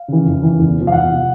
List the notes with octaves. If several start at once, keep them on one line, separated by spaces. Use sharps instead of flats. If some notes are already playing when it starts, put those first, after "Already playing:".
Already playing: F5
C#3 E3
F2
C#3 E3
E2
C3 F3
F5
E2 F#5
C3 F3